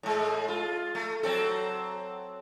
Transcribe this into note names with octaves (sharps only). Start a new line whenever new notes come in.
A2 G#3
F4
A3
F#3 C4 A4